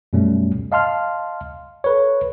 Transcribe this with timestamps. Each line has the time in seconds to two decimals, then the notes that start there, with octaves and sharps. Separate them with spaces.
0.13 F#2 B2 G3 A3 C#4
0.72 D#5 F5 A5 C6 F6
1.84 A4 B4 C#5